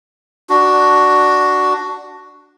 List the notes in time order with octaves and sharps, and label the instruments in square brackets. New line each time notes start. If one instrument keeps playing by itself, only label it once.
[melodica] D4 F#4